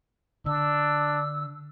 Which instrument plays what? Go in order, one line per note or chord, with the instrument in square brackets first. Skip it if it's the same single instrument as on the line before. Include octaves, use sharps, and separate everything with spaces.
[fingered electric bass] D3 [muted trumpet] D4 [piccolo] E6